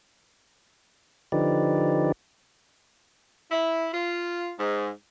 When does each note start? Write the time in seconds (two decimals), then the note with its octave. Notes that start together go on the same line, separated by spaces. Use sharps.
1.32 D3 F3 D#4 G4 B4 D5
3.50 E4
3.93 F4
4.59 G#2